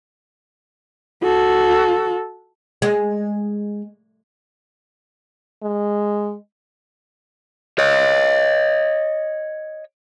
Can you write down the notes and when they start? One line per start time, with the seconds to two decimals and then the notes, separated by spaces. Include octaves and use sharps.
1.23 F#4 A4
2.82 G#3
5.63 G#3
7.79 C#5 D#5